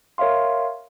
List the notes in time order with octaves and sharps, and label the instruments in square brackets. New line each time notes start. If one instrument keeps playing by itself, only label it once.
[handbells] A#4 C#5 E5 F5 C6